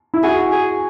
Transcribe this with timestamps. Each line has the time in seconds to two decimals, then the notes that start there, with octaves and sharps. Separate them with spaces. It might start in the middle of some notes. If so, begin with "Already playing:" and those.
0.14 E4
0.23 F#4 G#4
0.52 G#4